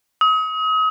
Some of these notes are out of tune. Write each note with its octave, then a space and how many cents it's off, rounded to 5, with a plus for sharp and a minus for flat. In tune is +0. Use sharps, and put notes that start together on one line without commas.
D#6 +35